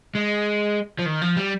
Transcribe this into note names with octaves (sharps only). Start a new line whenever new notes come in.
G#3
F3
D#3
F3
G3